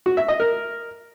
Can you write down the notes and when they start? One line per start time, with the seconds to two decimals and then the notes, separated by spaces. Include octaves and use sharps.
0.06 F#4
0.17 E5
0.28 D#5
0.40 A#4